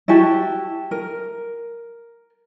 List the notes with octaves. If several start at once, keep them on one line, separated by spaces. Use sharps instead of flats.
E4 F#4 G4 A5
A#4